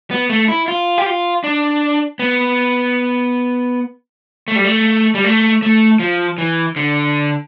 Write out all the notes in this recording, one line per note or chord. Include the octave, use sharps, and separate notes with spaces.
B3
A3
E4
F4
G4
F4
D4
B3
A3
G3
A3
G3
A3
A3
F3
E3
D3